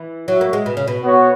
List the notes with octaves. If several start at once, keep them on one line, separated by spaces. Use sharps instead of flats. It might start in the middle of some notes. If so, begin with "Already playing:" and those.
Already playing: E3
F#3 F#4 C#5 E5
A#3
G#3
B2
C#3
B2
B3 F#4 C#5